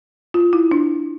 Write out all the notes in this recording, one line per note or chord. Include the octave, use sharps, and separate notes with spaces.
F4
E4
D4